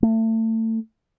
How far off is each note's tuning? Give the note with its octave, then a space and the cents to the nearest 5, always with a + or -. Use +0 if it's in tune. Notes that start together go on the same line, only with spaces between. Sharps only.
A3 +30